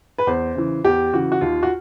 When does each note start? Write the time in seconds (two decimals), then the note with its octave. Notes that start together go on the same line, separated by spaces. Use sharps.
0.18 B4
0.27 E2 C5
0.55 C#3 E3
0.84 E2 G4
1.13 C#3 E3 F#4
1.32 F#4
1.41 D#2 F4
1.63 F#4